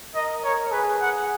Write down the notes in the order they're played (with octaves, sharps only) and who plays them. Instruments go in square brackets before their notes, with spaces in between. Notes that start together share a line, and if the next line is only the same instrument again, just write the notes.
[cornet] A#4 [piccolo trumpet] D#5
[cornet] A#4 [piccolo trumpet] C#5
[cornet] G#4 [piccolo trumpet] B4
[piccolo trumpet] F#5